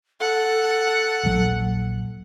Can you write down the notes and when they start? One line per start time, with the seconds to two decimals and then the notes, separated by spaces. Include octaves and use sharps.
0.20 A4 F#5
1.23 D#1 A#1 F#3